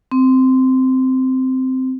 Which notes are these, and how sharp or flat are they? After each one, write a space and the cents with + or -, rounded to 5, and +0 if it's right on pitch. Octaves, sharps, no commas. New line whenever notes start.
C4 -10